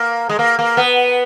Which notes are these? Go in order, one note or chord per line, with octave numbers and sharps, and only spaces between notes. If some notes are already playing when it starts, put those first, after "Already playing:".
Already playing: A#3
G#3
A#3
A#3
B3